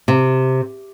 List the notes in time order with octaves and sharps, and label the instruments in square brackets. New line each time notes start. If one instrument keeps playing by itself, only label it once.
[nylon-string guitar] C3